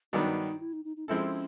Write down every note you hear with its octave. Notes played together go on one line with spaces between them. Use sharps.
G2 D#3 F#3 B3 D4 D#4
E4
D#4
D#4
D#4
F3 G#3 C4 C#4 E4 A4